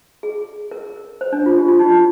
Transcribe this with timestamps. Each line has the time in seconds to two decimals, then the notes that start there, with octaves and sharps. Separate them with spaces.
0.23 G#4
0.71 A#4
1.21 C5
1.32 D4
1.46 F4
1.58 G4
1.68 F4
1.79 D#4
1.90 F4